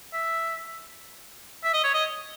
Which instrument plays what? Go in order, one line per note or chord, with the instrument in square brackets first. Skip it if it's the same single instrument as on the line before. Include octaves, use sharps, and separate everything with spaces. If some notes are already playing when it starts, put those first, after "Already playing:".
[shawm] E5
E5
D#5
C#5
D#5